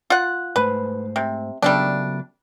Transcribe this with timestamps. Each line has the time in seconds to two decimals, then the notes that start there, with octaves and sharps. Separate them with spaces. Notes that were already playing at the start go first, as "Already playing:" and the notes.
0.10 F4 F#5
0.56 G#2 A3 B4 C5
1.16 C3
1.62 C#3 F#3 G3 A3 B3 D4